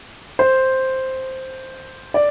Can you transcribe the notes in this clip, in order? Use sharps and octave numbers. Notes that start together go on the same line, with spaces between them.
C5
D5